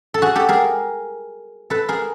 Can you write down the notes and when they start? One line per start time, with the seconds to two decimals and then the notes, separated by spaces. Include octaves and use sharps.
0.14 A4
0.22 F#4 G#4
0.35 G4 A4
0.49 G#4 A#4
1.70 A4 B4
1.88 G#4 A#4